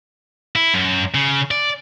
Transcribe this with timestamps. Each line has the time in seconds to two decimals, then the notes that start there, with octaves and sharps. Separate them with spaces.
0.56 E4
0.74 F#2
1.15 C#3
1.51 D5